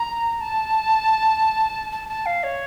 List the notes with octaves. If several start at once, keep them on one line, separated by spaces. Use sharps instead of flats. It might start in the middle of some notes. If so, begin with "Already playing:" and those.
Already playing: A#5
A5
A5
A5
F5
C#5